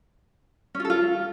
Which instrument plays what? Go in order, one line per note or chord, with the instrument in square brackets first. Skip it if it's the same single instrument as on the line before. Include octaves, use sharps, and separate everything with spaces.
[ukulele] C#4
F4
A4
F4